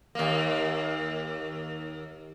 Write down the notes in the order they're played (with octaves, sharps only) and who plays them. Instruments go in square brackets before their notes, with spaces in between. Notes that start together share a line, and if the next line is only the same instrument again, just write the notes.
[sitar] D#2 A#3